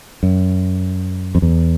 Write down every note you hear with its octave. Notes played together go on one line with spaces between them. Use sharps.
F#2
F2
E2